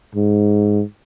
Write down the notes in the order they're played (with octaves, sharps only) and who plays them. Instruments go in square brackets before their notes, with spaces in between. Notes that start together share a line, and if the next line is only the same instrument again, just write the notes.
[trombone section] G#2